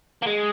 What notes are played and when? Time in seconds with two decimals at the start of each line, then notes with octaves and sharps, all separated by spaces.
0.22 A#3
0.26 G#3